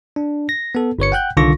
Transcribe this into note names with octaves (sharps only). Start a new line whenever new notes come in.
D4
A#6
B3 A4
G1 B4 C#5 C#7
F#5 G5 F#6 G6
C2 D3 D#3 F4 C#6 A#6